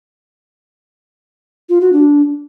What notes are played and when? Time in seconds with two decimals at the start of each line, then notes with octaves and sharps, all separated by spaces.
1.69 F4
1.81 F#4
1.93 D4